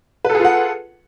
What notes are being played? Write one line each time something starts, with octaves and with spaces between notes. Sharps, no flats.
F4 G#4 A4 B4 F#5